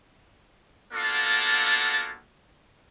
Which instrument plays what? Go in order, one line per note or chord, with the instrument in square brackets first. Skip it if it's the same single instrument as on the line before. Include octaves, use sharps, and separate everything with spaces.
[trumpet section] A#3 B3 D4 F4 F#4 A4